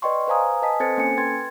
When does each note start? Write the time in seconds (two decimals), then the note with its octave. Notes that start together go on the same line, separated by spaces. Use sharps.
0.02 B4 D5 D#5 G5 C6 C#6
0.27 B4 C5 F5 G#5 A#5 D#6
0.62 B4 D#5 G#5 A5 D#6 B6
0.80 C4 A4 C5 G#6 A6 C#7
0.97 A#3 C#4 A4 G#5 C#7
1.17 B4 G5 C6 G#6 A6